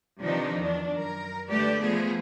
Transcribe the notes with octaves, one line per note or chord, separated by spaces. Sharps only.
C3 D#3 F3 D4 D#4 B4
E2 D#3 D4
F#2 A#4
D3 A3 G4 B4 D5
F3 A3 B3 G#4